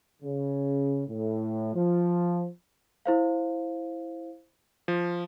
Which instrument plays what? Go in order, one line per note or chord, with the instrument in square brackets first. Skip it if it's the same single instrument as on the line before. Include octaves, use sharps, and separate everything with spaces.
[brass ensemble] C#3
A2
F3
[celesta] E4 C5 F5
[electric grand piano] F3